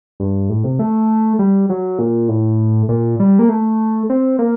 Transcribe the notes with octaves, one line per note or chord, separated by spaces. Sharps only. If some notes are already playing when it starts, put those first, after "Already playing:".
G2
A2
C3
A3
G3
F#3
A#2
A2
A#2
G3
A#3
A3
C4
A#3